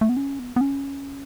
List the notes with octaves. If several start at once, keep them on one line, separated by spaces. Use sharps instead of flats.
A3
B3
C#4
B3
B3
C#4